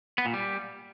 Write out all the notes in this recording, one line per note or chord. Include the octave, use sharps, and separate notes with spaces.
B3
A#2
G3